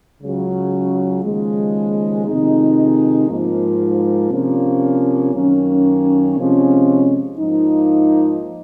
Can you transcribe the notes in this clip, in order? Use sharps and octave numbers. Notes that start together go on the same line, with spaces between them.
C#2 C#3 F#3
D#2 C#3 F3 G#3
F2 C3 D#3 G#3 D#4
G#2 F3 A#3
C3 F3 A#3 C#4
F#2 D#3 A#3 C#4
C3 F3 G#3 C#4
G#2 F3 A#3 D#4